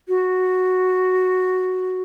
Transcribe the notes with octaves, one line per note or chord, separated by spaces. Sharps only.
F#4